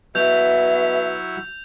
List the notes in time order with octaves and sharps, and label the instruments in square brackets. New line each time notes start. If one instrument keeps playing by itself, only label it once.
[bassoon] B2 [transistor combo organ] F#3 E4 [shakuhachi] E5 [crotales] G6 F7